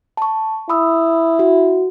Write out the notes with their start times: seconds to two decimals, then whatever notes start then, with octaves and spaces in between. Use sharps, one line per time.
0.17 A5 C#6
0.69 E4 B5 D#6 E6
1.39 F#4